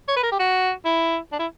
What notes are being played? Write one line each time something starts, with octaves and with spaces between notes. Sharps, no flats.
C#5
B4
A#4
G4
F#4
E4
D4
E4